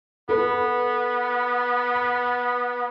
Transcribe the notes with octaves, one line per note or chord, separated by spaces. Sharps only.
B3 A4 B4